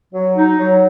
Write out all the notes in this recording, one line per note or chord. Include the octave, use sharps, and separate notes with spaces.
F#3
D#4
F#3